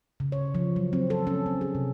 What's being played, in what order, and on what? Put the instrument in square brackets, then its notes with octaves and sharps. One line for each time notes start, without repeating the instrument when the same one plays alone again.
[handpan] C#3
C#5
F3
F#3
C4
A4
C#4
C4
G#4
C3